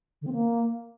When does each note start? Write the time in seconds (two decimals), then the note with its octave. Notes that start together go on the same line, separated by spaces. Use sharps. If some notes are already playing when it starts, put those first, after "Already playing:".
0.21 D3
0.27 C4
0.33 A#3